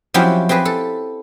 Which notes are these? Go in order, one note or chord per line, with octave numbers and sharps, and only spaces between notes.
F3 F#3 C4 C#4 E4 G4
C4 G4 G#4 B4
A4